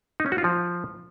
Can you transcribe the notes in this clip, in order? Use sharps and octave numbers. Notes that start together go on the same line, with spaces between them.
D#4
C#4
F#4
F4
F3